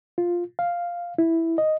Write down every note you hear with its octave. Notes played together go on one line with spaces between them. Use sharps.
F4
F5
E4
D#5